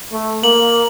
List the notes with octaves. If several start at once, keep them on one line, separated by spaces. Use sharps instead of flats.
A3
A#3 F#7